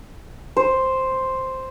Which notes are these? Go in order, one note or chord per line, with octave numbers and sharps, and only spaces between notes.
C5